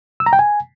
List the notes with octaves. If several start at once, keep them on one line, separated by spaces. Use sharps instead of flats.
E6
A#5
G5
G#5